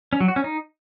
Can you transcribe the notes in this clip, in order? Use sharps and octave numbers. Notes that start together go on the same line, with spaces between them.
C#4
F#3
F#4
C#4
D#4